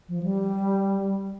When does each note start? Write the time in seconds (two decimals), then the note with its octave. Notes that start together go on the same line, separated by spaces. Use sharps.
0.09 F3
0.23 G3